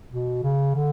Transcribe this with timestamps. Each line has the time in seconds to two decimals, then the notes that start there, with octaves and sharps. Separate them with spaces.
0.11 B2
0.43 C#3
0.75 D3